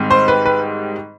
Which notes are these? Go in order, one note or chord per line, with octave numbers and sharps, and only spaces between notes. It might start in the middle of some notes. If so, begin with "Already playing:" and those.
Already playing: G#2 D#3 G3 C4
C5
B4
B4